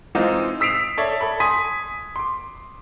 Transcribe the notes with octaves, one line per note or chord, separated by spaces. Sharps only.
E3 G#3 C4 D#4 F4
D#6 E6 B6 C7 D7 F7
A4 C#5 D5 E5
A4 B5
G#5 C6 D#6 B6
C6 D6